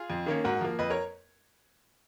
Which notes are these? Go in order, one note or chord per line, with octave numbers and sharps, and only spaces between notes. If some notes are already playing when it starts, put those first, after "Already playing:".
Already playing: F4 G#4
F2
D#3 A#3 C#4
G#2 F#4 A#4
F3 A#3
F2 B4 D#5
A#4 C#5